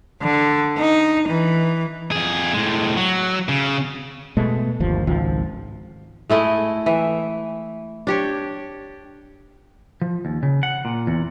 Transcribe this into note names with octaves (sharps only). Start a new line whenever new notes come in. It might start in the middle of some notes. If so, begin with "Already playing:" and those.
D3
D#4
E3
F2 G#4
A2 G#3
F#3
C#3
B2 G#3 A3
G1 D#2 F3
G#1 C#2 F3
G#3 A3 E4 D#5
E3 E5
D4 G4 C#5
F3
D#2
C#3
F#5
A#2
E2